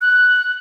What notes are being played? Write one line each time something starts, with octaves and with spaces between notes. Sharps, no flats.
F#6